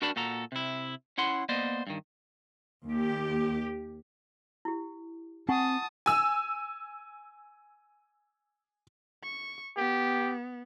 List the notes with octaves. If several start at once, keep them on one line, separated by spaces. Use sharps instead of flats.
D4 F#4 A#4 D5 A5 B5
A#2 F#4 A4 A#5
C3 E4
C#4 E4 F#5 C6
A#3 B3 C5 D5 D#5
G2 D#3
D#2 G4
E4 G4
C4 F#5 G#5 A5 C#6 D#6
G#5 E6
C#6
B3 G4